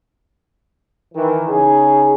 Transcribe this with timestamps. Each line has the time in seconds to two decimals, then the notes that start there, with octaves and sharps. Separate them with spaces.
1.14 D#3 E3
1.49 C#3 D#4 G#4